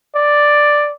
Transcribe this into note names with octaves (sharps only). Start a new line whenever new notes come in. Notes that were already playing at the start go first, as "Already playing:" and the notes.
D5